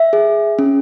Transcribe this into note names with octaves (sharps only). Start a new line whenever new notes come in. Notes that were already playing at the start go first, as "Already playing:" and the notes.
Already playing: E5
G#4
C#4